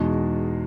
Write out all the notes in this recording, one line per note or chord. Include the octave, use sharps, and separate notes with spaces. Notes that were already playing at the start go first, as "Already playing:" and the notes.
Already playing: E2 B2 G#3 D#4 F#4